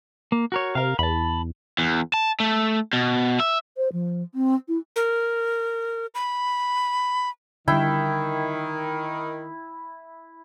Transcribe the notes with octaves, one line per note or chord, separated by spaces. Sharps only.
A#3
F#4 A#4 C#5
C3 A#4 F5
E2 A5 B5
E2
A5
A3
B2
E5
C5
F3
C4
E4
A#4
B5
D3 D#3 G3 E4 G5